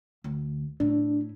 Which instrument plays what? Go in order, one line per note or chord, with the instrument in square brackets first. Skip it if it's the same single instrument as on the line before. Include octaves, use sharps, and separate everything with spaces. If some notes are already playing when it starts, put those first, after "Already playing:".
[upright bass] D2
[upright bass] A2 [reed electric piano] D4